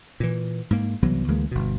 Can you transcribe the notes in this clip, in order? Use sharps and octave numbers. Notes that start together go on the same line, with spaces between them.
A#2 E3
G#2 A#3
C2 E3 F#3 B3
D2 E3 G#3 A#3
G1 B2